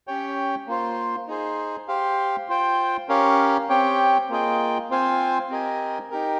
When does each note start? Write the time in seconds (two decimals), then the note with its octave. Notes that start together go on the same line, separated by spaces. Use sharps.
0.07 C#4 G4 C#5 G5
0.67 A#3 F4 C5
1.28 D#4 G#4 C5
1.88 G4 C5 F5
2.49 F4 C5 G5
3.09 C#4 G4 A#4 C#5 F5
3.69 C4 G4 C#5 G5
4.29 A#3 F4 G#4 D#5 G5
4.90 C4 F4 C5 F5 G#5
5.50 C4 G4 A#4 D#5 G#5
6.10 D#4 G4 A#4